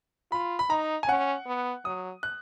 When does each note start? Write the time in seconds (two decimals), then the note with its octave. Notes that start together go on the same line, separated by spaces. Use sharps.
0.31 F4 B5
0.59 B5
0.70 D#4 A#5
1.03 G#5
1.08 C#4 F#5
1.46 B3
1.85 F#3 D#6
2.23 F#6